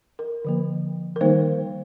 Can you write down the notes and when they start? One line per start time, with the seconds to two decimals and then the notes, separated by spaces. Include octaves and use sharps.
0.19 A#4
0.45 D3 F3 A#3
1.16 A#4
1.21 D#3 G3 A#3 D#4 C5